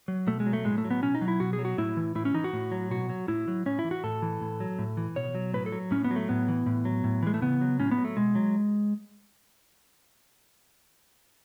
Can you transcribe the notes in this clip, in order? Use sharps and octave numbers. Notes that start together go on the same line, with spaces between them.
F#3
B2 A3
G#3
F#3
A3
A2 G#3
A3
F#3
B3
B2 C#4
D#4
F#3
E4
B2 F#4
G#4
F#3
F#4
A2 E4
E3
A2 E4
C#4
E3 D#4
F#4
A2
F#3
B2 F#4
F#3
A2 E4
F#3
A2 C#4
E4
E3
F#4
A2 A4
E3
A2
F#3
A2
E3
B2 C#5
F#3
A2 B4
A4
F#3
A2 C#4
B3
F#3
A3
A2 B3
E3
A2
F#3
A2
E3 G#3
A3
C#3 B3
F#3
A2 C#4
B3
F#3
A3
B2 G#3
F#3